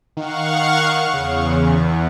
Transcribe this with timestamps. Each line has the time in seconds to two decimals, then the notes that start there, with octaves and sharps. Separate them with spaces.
0.17 D#3 F5 F#5 C#6
1.14 E2 C#3